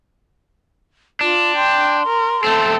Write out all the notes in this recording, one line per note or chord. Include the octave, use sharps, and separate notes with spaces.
D4 F4
G5 C6
A#4
A3 C4 A4